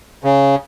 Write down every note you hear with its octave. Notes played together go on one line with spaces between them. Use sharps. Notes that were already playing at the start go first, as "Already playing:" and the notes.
C#3